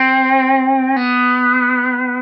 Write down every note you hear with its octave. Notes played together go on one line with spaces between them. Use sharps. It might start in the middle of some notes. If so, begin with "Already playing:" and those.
Already playing: C4
B3